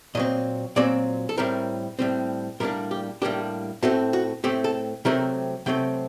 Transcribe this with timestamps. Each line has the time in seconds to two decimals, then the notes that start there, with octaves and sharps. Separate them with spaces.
0.15 A#2 F#3 C4 D#5
0.76 A#2 F#3 C4 D5
1.29 A4
1.37 A2 G3 C4 A#4
1.99 A2 G3 C4
2.60 A2 G3 A#3 D4 A#4
2.91 G4
3.22 A2 G3 A#3 D4 G4
3.83 A2 A3 C4 F#4
4.13 F#4
4.44 A2 A3 C4 G4
4.64 A4
5.05 C3 F#3 A3 C4 A#4
5.66 C3 F#3 A3 C4 G5